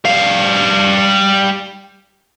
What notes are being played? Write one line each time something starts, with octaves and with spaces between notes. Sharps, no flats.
G3 F5